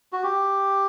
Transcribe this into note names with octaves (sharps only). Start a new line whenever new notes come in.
F#4
G4